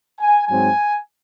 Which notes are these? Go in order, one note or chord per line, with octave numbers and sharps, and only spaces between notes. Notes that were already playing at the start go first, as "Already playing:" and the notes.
G#5
G#2 F#3 C4 G#5